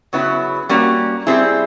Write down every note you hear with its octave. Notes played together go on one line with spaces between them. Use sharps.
C#3 F#3 B3 E4
G3 A#3 C#4 F#4
G3 C4 E4 G#4